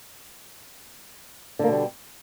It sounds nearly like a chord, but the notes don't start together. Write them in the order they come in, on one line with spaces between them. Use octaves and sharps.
D3 A#3 B2 G3